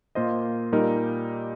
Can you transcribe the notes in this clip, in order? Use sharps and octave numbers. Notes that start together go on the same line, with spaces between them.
A#2 A#3 F4 C5 D#5
A#2 G3 D#4 A#4